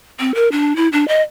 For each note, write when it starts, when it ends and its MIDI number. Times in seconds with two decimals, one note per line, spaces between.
0.20 0.34 60
0.35 0.49 70
0.52 0.76 62
0.76 0.88 64
0.93 1.07 62
1.08 1.22 75